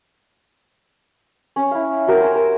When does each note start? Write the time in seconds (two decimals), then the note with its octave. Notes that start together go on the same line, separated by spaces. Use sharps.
1.56 C#4
1.71 E4 F5
2.07 F#4 G4 A#4
2.20 C5 G#5 A#5 E6
2.35 A#4